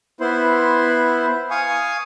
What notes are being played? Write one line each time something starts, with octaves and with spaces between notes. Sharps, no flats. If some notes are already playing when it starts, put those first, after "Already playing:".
B3 E4 C5 C6
F5 G#5 C#6 D#6